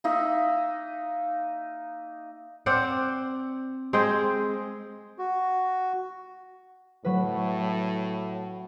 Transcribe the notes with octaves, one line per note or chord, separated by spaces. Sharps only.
A#3 D#4 E5
C4 C5 D5 F#5
G#3 C4 G#4 G5
F#4
A2 F#3 B4